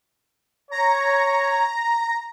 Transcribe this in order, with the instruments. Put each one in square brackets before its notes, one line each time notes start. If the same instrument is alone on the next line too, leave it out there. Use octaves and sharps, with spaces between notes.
[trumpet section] C#5 [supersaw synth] A#5